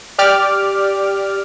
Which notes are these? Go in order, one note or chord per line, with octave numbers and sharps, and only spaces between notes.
G4 D5 D6 F6